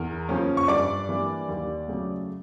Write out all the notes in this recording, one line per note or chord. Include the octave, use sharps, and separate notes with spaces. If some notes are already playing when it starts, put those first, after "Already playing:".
Already playing: E2 A#4
C#3 F3 A#3 C#4
C#6
G2 D5 D6
E3 G3 A#3 D4
D#2
C#3 F#3 A3